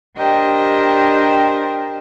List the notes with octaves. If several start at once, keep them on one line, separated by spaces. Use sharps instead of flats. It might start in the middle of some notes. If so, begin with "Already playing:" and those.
D4 G4 A#4 C5 D#5 G5